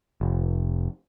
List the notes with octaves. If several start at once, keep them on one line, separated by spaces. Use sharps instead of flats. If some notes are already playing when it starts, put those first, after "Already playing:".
F1